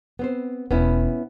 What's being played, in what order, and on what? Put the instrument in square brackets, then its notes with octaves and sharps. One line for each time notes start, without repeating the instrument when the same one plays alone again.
[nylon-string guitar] B3 C4 C5
[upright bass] E1 [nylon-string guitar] B3 C#4 E4